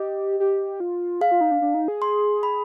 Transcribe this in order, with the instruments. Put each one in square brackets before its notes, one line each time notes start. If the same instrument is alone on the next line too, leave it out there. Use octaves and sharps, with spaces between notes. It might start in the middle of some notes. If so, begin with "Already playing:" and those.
Already playing: [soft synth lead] G4 [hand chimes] D#5
[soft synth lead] G4
F4
[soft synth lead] G#4 [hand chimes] F5
[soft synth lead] F4
D#4
D4
D4
D#4
G#4
[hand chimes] C6
B5